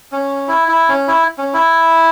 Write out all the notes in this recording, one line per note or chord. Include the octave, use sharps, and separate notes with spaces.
C#4
E4
E4
C#4
E4
C#4
E4